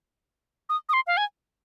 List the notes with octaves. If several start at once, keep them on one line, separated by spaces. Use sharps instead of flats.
D#6
D#6
C6
F5
G#5